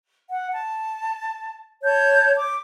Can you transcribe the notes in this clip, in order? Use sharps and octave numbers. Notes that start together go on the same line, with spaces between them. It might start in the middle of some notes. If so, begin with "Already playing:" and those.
F#5
A5
C#5 A5 G6
D6